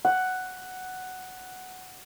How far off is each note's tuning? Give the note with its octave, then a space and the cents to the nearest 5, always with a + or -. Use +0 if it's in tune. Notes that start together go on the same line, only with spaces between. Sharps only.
F#5 +5